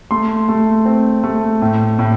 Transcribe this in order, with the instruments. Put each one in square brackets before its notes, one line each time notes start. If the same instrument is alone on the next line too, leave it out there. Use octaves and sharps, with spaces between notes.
[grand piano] A3 C6
A3
C4
A3
A2
A2